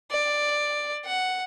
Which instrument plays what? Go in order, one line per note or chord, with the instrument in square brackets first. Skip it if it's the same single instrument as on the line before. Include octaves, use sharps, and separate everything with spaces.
[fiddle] D5
F#5